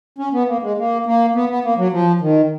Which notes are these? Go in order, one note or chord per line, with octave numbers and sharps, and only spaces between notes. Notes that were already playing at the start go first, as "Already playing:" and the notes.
C#4
B3
A#3
G#3
A#3
A#3
B3
B3
A#3
F#3
F3
D#3